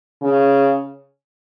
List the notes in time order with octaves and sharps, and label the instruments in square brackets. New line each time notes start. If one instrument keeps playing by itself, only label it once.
[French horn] C#3